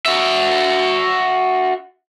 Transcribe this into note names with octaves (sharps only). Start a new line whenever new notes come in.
F#4 E5